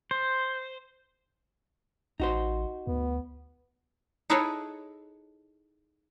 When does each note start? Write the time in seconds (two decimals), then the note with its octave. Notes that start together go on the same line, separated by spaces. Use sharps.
0.11 C5
2.20 A1 D#4 F#4 C5
2.87 D2 B3
4.30 D#4 E4 G#4 A4 B4 C#5